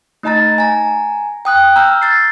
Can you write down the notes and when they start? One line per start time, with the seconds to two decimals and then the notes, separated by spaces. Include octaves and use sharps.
0.23 A3 D#4 D#5 A5 A#5 A6
0.58 G#5 A#5
1.45 G5 D#6 F#6
1.76 A#5 E6 F6 G6
2.02 G6 A6 C7